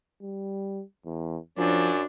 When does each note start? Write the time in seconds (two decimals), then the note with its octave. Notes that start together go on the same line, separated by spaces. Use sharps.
0.22 G3
1.05 E2
1.58 F#2 F3 C#4 D4